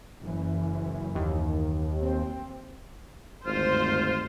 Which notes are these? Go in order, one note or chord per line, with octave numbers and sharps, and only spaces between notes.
F#1 F#2 E3
D#2
C4
G#1 D2 G2 F4 C5